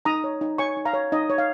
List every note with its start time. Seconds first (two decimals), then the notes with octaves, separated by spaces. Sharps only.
0.05 D#4 A#5 D#6
0.24 C#5
0.41 D#4
0.58 C#5 G#5 C#6
0.77 D#4
0.85 F5 A#5
0.94 C#5
1.12 D#4 D#5
1.30 C#5
1.38 F5